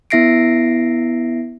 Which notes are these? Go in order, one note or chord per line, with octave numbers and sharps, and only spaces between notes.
B3 E4 E5 A#6 C7 D7